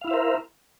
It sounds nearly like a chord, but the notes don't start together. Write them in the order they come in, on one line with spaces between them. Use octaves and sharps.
F5 E4 E5 C5 A#4